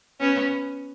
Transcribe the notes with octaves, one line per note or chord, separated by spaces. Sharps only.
B3 C#4